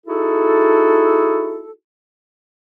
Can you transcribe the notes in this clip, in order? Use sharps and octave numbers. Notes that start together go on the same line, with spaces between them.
D#4 E4 F#4 G#4 A4